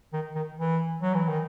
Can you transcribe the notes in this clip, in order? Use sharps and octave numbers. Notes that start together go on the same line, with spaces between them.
D#3
D#3
E3
F#3
E3
D#3